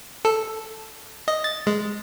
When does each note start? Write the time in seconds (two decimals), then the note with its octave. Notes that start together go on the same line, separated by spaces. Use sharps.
0.25 A4
1.28 D#5
1.44 A6
1.67 G#3